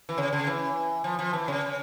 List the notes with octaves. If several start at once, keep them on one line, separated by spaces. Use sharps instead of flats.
E3
C#3
C#3
E3
F3
F3
E3
C#3